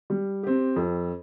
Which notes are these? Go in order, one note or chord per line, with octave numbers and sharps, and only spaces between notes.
G3
C4 G4
F2